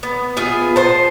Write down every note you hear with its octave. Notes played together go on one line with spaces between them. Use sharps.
B3
B3 F4 G#4 E5
C5 A5